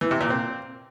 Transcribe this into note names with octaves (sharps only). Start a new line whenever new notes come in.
E3
C3
A#2
C4